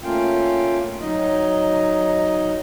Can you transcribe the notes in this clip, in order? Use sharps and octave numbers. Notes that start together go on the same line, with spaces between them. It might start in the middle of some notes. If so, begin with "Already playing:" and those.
A3 A#3 C#4 F4 F5 G5
F#3 D#4 D#5